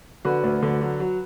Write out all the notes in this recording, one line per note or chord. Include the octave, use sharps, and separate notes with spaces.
D3 F#4 B4
D2
D3
F#3
F#3